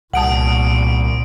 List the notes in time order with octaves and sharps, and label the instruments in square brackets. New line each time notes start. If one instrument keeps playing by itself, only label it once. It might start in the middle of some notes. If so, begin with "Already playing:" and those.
[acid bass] C2 [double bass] A#2 [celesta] F#5 A5 [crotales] D#6 D7 F#7